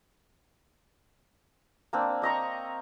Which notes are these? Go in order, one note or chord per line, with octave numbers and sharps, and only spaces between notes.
A#3 C4 D4
C4 D#5 A#5 C#6